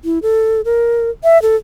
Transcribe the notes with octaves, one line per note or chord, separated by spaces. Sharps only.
E4
A4
A#4
E5
A4